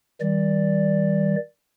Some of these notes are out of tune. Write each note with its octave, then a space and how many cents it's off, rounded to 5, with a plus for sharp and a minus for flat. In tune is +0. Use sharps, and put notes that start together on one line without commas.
D#3 +35 G3 +0 D5 +0